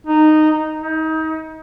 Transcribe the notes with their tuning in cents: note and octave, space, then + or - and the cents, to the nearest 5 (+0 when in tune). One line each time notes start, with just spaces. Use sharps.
D#4 -10
D#4 +30